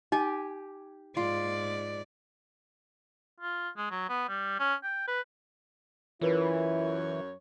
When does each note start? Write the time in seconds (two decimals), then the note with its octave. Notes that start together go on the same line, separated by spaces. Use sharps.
0.12 D#4 G4 G#5
1.17 G#2 F4 D5
3.40 F4
3.77 G#3
3.91 F#3
4.09 B3
4.29 G3
4.60 C#4
4.84 G5
5.08 B4
6.21 F#2 E3 E4 F4 A#4 B4 C#5